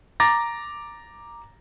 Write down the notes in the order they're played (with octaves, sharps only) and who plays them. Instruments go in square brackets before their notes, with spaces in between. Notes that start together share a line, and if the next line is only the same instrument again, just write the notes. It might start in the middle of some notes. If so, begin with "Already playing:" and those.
[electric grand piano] A#5 D6 A6 A#6